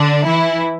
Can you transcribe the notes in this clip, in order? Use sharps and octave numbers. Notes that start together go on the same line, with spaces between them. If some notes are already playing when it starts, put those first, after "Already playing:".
Already playing: D3 D4
E3 E4